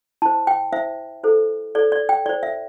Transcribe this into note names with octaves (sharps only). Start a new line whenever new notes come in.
E4 C5 A5
G5
E4 C5 E5
E4 A4 C5
E4 A4 C5 D5
D5
G5
E4 C5 D5
E5